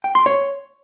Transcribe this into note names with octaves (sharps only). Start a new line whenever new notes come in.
G5
C6
C#5